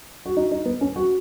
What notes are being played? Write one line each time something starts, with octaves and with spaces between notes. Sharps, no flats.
F#4
D#4
D#4
B3
C#4
F#4